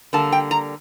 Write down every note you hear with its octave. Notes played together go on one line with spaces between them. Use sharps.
D3 G3 A#3 A5
G5
A#5